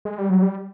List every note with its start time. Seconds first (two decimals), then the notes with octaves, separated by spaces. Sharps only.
0.05 G#3
0.18 G3
0.30 F#3
0.42 G3